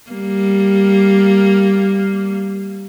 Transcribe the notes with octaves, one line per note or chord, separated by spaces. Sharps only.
G3 A#3